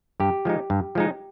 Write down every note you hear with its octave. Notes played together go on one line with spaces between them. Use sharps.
G2 G4
F3 G#3 D#4
G2
F3 G#3 D#4